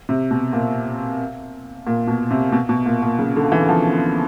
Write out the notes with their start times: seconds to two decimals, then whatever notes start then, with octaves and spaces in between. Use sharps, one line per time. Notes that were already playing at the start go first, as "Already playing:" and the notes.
0.09 C3
0.31 B2
0.53 A#2
1.87 A#2
2.08 B2
2.31 C3
2.52 B2
2.69 B2
2.86 A#2
3.02 A#2
3.19 C#3
3.36 D3
3.52 E3
3.69 F3